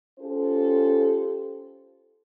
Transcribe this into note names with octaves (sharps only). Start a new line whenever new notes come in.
C#4 F4 G4 A4 C5